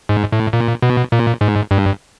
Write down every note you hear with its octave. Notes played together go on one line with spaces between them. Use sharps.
G#2
A2
A#2
B2
A#2
G#2
G2